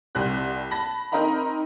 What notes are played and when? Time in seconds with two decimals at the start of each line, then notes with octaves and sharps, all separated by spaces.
0.15 C2 G3 C4 F#6
0.70 A5 B5 A#6
1.12 C4 D#4 A#4 D#5 A#5 B5